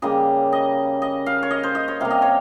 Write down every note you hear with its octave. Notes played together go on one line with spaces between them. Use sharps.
C#3 G3 A#3 D#5
D#5
D#5
F5
C#5
D#5
C5
D#5
C#5
C3 G3 A#3 F5
D#5
C#5